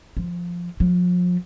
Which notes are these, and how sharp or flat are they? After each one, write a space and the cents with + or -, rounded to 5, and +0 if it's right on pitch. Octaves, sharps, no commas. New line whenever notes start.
F3 +0
F3 +35